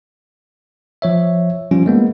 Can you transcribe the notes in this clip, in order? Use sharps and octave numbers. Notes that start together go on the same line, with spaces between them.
F3 C#5 E5
F3 G3 C#4 F4
G#3 A#3 B3